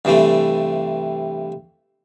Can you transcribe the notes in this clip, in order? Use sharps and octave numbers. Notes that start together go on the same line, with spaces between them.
G2 C3 E3 A3